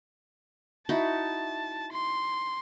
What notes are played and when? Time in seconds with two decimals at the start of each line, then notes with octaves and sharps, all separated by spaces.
0.89 D#4 E4 F#4 A5
1.92 C6